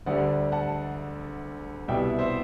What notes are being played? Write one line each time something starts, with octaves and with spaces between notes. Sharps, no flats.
D2 D3 G3 D5 F#5
F#5 A5
C2 B2 G3 E5 G5
C5 E5